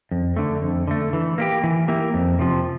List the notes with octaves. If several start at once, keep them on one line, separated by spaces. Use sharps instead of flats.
F2
D3 A3
F2
D3 A3
E3
A#3 E4 G4
E3
A#3 E4 G4
F2
C3 F3